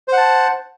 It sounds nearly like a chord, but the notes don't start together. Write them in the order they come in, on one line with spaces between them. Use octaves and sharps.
C5 F#5 A5